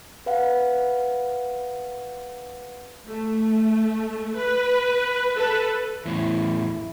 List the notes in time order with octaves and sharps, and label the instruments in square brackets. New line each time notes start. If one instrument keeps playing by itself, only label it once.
[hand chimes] B4 F5 F#5
[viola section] A3
B4
A4 B4
[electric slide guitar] E2 A2 [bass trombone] E4